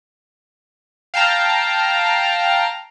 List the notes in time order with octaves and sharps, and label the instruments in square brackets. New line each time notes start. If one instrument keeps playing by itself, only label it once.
[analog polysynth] F5 G5 A5 A#5